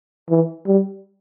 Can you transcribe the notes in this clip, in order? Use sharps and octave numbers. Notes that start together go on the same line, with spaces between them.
E3
G3